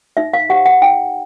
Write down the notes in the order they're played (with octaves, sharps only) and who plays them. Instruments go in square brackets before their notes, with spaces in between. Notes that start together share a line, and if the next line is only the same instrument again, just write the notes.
[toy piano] D#4 E5
F5
G4 C5 F#5
F#5
D#4 G5